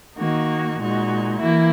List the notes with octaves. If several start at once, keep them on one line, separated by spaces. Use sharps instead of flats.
D#3 A#3 D#4 F#4
A#2 G#3 D#4 F#4
E3 A#3 E4